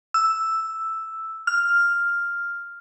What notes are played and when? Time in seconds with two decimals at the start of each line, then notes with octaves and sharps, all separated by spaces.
0.14 E6
1.47 F6